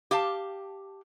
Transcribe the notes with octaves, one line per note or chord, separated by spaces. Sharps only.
G4 F5 A5